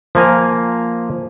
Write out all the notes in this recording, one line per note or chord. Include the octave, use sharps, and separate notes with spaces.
F3 A#3 G#5 A#5